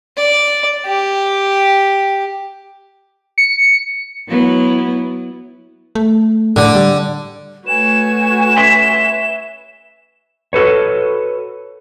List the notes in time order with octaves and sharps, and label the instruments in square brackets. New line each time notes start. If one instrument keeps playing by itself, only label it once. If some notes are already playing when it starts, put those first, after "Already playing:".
[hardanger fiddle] D5
G4
[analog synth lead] C#7
[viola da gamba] F#3 B3 E4
[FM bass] A3
[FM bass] A2 [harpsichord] D3
[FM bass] G3
[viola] A3 F#4 [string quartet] B4 C#5 G#5 [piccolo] E7
[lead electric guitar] E5 C6
[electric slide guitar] F#4 A4 B4 C#5